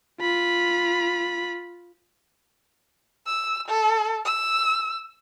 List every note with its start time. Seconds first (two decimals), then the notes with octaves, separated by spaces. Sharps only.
0.21 F4 B5
3.27 E6
3.68 A4
4.25 E6